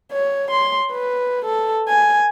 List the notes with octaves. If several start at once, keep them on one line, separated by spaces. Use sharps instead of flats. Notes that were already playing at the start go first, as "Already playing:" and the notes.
C#5
C6
B4
A4
G#5